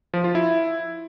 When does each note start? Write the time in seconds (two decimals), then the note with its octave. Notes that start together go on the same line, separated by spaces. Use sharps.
0.14 F3
0.24 F4
0.35 E4